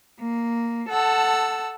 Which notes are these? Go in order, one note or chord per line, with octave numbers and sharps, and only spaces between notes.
A#3
A4 F#5 A5 E6